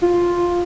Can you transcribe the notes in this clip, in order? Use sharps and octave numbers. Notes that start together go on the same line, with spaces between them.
F4